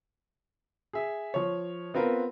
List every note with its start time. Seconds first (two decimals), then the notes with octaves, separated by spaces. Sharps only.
0.93 G#4 E5
1.34 F3 C#5
1.94 B3 C4 F4 A#4 B4